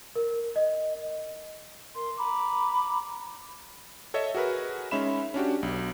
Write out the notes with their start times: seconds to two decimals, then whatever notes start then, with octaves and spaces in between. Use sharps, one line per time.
0.16 A#4
0.56 D#5
1.93 A#4 C6
2.17 A#5 B5 D6
4.14 A4 C#5 D#5 E5
4.35 F#4 G#4 A#4 B4
4.91 G#3 C#4 D#4 E5 B5 E7
5.34 C#4 D4 F#4 G4
5.63 B1